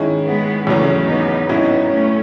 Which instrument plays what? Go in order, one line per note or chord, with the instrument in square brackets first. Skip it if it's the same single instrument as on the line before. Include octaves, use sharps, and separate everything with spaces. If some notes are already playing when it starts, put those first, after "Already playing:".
Already playing: [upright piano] D#3 G#3 C#4 E4
[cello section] G#3 B3
[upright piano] E2 C#3 F#3 [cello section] A3 C#4
[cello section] B3 D#4
[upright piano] A2 F#3 C#4 E4 [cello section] B3 D#4
[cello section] A3 C#4